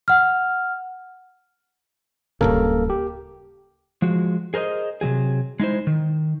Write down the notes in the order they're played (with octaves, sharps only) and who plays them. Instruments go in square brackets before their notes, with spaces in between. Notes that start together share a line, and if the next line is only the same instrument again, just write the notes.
[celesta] F#5 F6
[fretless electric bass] D1 G2 C#3 [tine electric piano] A#3 A4 A#4
[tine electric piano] G4
[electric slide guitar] F3 G#3 F#4
G#4 A#4 C5 D5 D#5
C3 F3 F#3 G#4
G#3 D#4 E4 C5
D#3